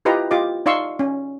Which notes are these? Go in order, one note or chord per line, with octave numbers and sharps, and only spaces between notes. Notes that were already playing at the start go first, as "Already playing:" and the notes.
E4 F4 G4 B4 D#5 A#5
F4 G4 D#5 D6
D#4 D5 F5 C6 C#6 E6
C#4